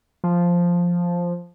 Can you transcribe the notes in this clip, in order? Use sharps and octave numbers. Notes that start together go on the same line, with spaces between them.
F3